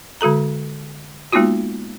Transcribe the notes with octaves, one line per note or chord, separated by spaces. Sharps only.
D3 G#3 F#4 A4 A#5
G#3 A#3 B3 D#4 F4 F#4